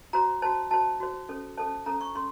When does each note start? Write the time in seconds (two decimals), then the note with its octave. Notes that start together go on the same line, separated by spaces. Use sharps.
0.13 F#4 C5 A#5
0.42 F#4 C5 A5
0.71 F#4 C5 A5
1.00 F#4 C5
1.29 C#4 A4 C5
1.57 C#4 A4 C5 A5
1.86 C#4 A4 C5 A#5
2.01 C#6
2.15 C#4 A4 C6